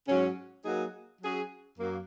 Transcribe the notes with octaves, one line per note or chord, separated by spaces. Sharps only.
G#2 F#3 C#4
F#3 A#3 D#4 G#4
F#3 C#4 G#4
F#2 F#3 A#3